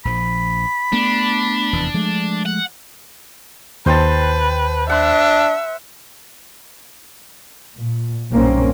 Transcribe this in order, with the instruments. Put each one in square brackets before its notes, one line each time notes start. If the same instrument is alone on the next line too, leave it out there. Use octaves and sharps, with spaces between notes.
[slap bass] A#1 F3 [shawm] B5
[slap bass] A3 B3 [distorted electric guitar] D4
[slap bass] F1 E2 E3
F3 G#3 A3
[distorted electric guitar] F#5
[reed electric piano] D#2 [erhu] B4 [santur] C5 G5 A5
[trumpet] D4 [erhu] E5 [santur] F#5 C6
[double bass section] A#2
B1 G2 A#2 A#3 C4 C#4